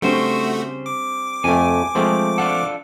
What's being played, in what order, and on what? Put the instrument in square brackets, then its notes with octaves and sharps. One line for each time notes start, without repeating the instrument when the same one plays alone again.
[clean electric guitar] C#3 C5 [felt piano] G3 C4 D4 [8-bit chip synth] A3 F#4
[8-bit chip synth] D6
[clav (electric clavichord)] F2 A3 [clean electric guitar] G#5
[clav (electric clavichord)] F3 A3 C4 [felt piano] G#3 G#4
[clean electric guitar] D4 F4 A4 [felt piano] F#5